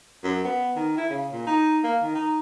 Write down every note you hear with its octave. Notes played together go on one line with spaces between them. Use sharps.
F#2
B3
D#3
E4
C#3
A#2
D#4
A#3
D#3
D#4